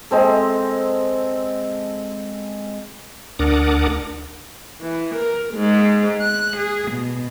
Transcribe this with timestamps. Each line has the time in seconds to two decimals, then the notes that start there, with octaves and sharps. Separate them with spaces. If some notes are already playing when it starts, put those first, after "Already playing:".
0.11 G#3 C4 A4
3.39 D2 D4 A#4 F#5 D6 D#6
4.83 E3
5.16 A#4
5.55 G#2
6.23 F#6
6.58 G#4
6.92 B2